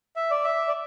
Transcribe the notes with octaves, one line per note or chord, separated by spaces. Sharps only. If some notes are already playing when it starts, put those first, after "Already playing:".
E5
D5
E5
D5